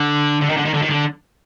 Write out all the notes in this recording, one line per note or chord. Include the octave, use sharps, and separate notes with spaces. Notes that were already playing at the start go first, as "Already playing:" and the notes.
Already playing: D3
D3
D#3
D3
D#3
D3
D#3
D3